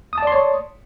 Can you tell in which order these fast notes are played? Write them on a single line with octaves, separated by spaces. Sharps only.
D#6 A5 D5 C6 C#5